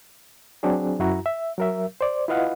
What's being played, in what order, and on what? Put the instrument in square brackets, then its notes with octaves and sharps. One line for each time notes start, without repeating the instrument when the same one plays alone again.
[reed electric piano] F#3 C4 D4 G#4
F#2 E4 F#4 A#5
E5
F#3 A#4 E5
C5 D5
E4 F4 B4 D#5 F5 F#5